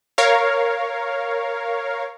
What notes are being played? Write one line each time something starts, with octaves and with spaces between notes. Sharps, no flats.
A#4 C#5 F5